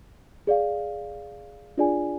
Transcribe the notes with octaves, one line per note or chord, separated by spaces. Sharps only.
G#4 D5 F5
D4 F4 G#4 D5 G#5